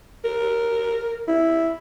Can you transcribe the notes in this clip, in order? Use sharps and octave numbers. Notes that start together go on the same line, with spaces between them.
A#4
E4